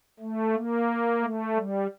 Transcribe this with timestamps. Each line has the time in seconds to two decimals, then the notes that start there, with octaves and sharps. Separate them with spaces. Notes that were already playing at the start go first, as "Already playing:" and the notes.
0.20 A3
0.54 A#3
1.22 A3
1.56 G3